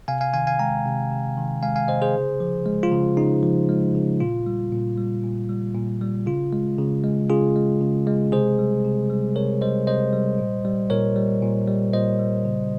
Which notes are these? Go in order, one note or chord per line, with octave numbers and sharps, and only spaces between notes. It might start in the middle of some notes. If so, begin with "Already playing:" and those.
C3 F5 G#5
F5 G#5
D#3 F5 G#5
F5 G#5
G#3 G5 A#5
C3
C3
D#3
G#3 F5 G#5
F5 G#5
C3 C5 D#5
G#4 C5
C#3
F3
G#3
F4
C#3
C#3 D#4
F3
G#3
C#3
A#2 F4
G3
A#2
G3
A#2
G3
A#2
G3
C#3 F4
G#3
C#3
G#3
C#3 F4 G#4
G#3
C#3
G#3
C3 G#4 C5
G3
C3
G3
C3 A#4 C#5
G3 C5 D#5
C3 C5 D#5
G3
A#2
G3
A#2 A#4 C#5
G3
A#2
G3
A#2 C5 D#5
G3
C#3